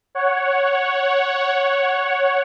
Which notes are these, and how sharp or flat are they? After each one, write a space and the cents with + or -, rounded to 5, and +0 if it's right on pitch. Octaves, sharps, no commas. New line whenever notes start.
C#5 +0 F#5 +0